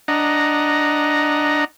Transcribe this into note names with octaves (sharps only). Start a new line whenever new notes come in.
D4 D#5 F#5 A#5